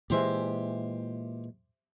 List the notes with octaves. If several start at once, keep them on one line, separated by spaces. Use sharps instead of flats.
A#2 E3 G#3 G4 C5 E5